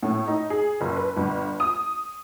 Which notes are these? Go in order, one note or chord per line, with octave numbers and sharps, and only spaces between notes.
A2
D#4
G#4
F#1
B4
G1
D#6